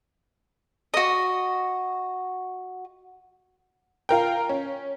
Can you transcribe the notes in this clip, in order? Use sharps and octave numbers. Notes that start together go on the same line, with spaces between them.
F#4 D#5
F4 A#4 G5
C#4